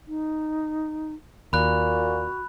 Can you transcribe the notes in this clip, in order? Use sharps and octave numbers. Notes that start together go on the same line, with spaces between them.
D#4
D#2 A#2 F#4 B5 F#6